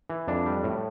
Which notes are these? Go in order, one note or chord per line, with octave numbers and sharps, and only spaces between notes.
E3
F2 D4
G3
A2